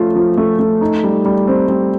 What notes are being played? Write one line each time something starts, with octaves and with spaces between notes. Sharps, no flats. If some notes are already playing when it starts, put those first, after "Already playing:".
Already playing: F3 A3 C#4 F4
F3
A3
A3
D#4
G3
G3
C4
G3